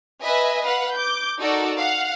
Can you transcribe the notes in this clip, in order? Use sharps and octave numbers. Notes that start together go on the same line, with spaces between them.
B4 D#5 E5 G#5
B4 F5 F#5
D6 G6
D#4 F#4 A4 A#4 D5
F5 F#5